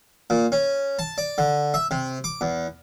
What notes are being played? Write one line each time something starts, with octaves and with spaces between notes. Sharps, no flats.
A#2
C#4
A5
D5
D3
E5
C3
D6
E2